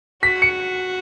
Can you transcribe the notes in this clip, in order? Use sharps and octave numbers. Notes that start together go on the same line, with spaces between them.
F#4 B6
C#7